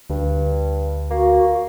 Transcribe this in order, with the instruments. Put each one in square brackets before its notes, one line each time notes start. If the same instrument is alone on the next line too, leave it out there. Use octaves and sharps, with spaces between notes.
[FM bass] D2 [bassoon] G2
[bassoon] A#3 [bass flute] F#4